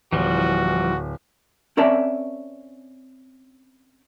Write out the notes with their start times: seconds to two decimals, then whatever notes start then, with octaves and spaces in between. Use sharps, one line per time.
0.13 D1 E3 F3 G3 F#4
1.77 C4 C#4 A#4 D5 E5 A5